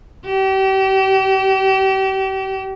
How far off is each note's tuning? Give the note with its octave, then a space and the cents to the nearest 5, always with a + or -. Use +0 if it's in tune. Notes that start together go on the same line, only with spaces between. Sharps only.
G4 -35